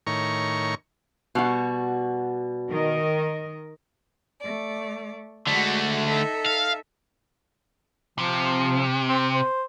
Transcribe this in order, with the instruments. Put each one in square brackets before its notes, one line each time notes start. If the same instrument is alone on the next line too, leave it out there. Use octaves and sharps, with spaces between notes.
[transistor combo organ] A2 D#3 A#4 C#5 C#6
[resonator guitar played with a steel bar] B2 G3 F#4
[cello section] D#3 A#4 D#5
[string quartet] A3 D5
[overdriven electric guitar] D3 A3 [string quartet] G#3 F#4
[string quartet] D#4 A4 E5
[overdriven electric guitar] F5
[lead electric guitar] C3 [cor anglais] F3
[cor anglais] C4
C5